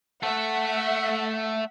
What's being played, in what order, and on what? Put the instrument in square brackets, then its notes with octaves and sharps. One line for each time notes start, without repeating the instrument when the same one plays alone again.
[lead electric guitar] A3 A4 [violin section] E5 F#5